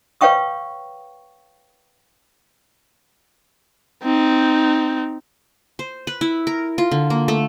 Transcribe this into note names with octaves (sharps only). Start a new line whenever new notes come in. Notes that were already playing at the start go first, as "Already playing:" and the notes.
B4 C#5 F5 G5 C#6 D#6
C4 D#4
C5
B4
E4
A#4
F4
D3
A#3
A3